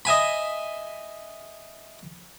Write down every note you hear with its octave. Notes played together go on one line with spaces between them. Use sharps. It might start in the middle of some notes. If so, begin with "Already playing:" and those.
D#5 E5 G#5 B5